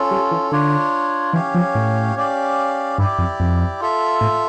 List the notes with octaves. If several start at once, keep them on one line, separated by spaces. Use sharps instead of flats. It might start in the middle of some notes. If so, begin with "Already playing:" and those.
Already playing: C#4 F4 A4
G3
E3
D3 D4 F4 C#5
E3 C#4 G4 C#5 F5
F3
A2
C#4 G4 D5 F5
G2 E4 G4 D5
F2
F2
F4 A4 E5
A2